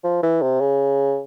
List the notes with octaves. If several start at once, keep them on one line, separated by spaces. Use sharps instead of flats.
F3
E3
C3
C#3